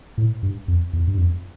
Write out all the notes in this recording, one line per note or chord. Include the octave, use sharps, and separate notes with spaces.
A2
G2
F2
E2
G2
F2